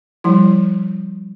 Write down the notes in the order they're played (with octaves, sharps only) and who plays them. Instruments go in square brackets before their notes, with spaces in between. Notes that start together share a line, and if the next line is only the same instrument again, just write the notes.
[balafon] F3 G3 E4